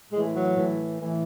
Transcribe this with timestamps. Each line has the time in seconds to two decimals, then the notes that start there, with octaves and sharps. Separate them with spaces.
0.12 A2 E3 G#3
0.34 F#3
0.56 A2 E3
0.99 A2 E3